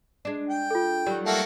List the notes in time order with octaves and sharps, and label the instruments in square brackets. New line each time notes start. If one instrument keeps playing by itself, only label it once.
[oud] G#3 D4
[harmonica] G5
[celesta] F4 A4
[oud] D#3 F#3 G3
[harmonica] A3 A#3 F#4